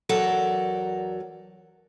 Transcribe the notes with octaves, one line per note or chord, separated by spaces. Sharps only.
E2 F#3 A4 A#4 D5